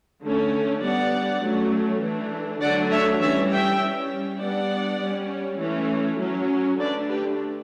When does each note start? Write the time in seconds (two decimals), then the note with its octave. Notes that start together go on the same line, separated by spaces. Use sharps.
0.23 D3 A3 C#4
0.82 G3 B3 D4 D5 F#5
1.42 F#3 A3 C#4
2.02 E3 A3 D4
2.61 D3 F#3 A3 D4 D5 F#5
2.91 C#5 E5
3.21 E3 G3 C#4 C#5 E5
3.51 E5 G5
3.80 G3 C#4
4.40 G3 B3 D4 D5 F#5
5.01 G3 C#4
5.59 E3 A3 C#4
6.19 F#3 C#4
6.79 D3 A3 D4 B4 D5
7.09 G4 B4